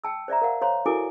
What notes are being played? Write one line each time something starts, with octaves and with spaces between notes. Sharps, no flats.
G5 A5 E6
C5 D5 E5 A#5
A#4 F5 F#5
C5 C#5 F5 A#5 C6
E4 F#4 A4 A#4 G#5 D6